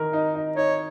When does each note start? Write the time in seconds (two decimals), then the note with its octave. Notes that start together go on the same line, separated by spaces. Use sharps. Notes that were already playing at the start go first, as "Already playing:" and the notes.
Already playing: D#3 A#4
0.13 D#4
0.35 D#4
0.56 D#4 C#5